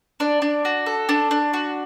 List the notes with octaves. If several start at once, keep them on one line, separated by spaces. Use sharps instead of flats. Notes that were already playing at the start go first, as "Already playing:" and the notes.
D4 D5
D4
F#4
A4
D4
D4
F#4